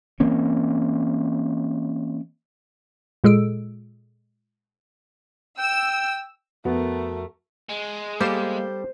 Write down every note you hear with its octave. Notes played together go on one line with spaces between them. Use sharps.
E3 A#3 C4 C#4
A#2 G#3 G#4 A4 E6 D7
G5 E6
F2 A3 B3 F#4 A#4
G#3
G3 A#3 G4 A4 C5